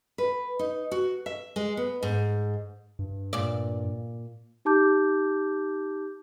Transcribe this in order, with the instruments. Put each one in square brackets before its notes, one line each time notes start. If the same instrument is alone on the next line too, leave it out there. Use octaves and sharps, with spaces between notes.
[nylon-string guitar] B4
D#4
F#4
E5
G#3
B3
G#2
[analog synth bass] G2
[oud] A#2 D5
[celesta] D#4 G4 A5 D6 G6